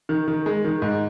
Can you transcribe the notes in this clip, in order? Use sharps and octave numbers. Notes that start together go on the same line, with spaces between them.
D#3
D#3
G#3
D#3
G#2